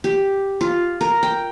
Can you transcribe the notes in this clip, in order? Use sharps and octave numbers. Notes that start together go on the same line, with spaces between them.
G4
F4
A#4
G5